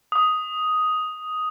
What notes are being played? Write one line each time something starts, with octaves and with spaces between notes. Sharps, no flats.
D#6